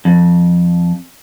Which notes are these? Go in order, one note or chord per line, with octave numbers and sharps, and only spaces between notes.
F2